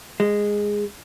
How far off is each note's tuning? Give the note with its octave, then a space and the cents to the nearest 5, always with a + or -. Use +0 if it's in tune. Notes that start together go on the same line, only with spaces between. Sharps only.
G#3 -10